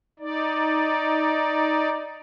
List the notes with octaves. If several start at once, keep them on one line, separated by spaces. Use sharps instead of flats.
D#4 D5